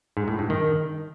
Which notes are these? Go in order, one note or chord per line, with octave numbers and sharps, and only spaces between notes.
G#2
A2
G2
D#3